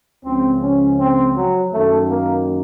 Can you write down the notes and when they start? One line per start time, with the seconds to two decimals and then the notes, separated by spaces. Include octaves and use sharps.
0.23 C#2 C#3 F3 C4
0.60 C#4
0.98 C4
1.35 F#3
1.72 F#2 D#3 A3
2.09 A#3